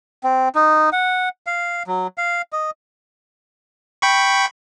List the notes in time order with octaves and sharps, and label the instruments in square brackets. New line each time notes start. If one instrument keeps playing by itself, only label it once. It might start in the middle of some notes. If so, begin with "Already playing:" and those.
[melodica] C4
D#4
F#5
F5
F#3
F5
D#5
[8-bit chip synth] G5 B5 C#6